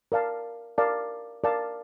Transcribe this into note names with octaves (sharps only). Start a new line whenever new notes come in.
A#4 D5 F5 A5
A#4 D5 F5 A5
A#4 D5 F5 A5